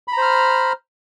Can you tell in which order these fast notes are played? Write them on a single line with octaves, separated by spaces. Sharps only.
B5 A#5 C5 F6